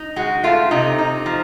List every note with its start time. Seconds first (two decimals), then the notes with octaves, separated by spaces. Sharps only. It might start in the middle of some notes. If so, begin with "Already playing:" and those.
Already playing: D#4
0.16 G#3 F#4
0.43 A3 F4
0.71 C3 D#4
0.98 D#4
1.26 F3